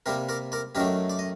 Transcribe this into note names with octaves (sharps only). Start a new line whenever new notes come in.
C3 G3 A#3 G4 A#4
A#4 D5
A#4 D5
F#2 D#3 F#3 A3 G4 A#4
D5
D#5